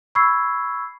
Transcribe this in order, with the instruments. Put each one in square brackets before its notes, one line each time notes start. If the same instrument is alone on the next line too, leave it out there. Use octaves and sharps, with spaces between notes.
[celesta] B5 C#6 E6 G#6 C7